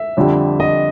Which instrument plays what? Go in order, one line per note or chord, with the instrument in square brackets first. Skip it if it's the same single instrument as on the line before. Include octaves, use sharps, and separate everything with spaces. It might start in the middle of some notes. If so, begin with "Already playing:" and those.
Already playing: [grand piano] E5
[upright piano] F2 D3 G3
[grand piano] D#5